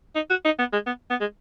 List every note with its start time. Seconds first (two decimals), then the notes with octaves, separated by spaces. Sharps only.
0.15 D#4
0.30 F#4
0.45 D#4
0.59 B3
0.73 G#3
0.87 B3
1.10 B3
1.20 G#3